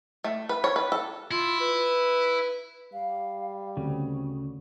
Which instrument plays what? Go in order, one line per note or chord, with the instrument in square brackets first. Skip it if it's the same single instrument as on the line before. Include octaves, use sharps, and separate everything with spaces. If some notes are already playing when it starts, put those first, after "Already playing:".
[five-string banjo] A3
B4
C#5
B4
A4
[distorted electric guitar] E4 [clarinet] F4
[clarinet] B4
[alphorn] G3 [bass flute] F5
[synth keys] D2 [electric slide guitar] C#3 [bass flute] C4